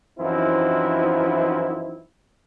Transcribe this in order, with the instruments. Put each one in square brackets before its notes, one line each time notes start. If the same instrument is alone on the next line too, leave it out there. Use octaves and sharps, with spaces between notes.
[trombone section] F#2 E3 F3 C4 D#4 E4